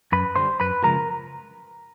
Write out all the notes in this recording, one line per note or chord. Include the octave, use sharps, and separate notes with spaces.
F#2 B4 B5
D3 G3 C5 C6
F#2 B4 B5
C#3 F3 G#3 A#4 A#5